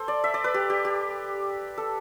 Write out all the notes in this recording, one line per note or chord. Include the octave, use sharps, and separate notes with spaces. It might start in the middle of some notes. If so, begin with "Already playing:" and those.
Already playing: A4 C5
D5
E5
D5
B4
G4
G4
G4
A4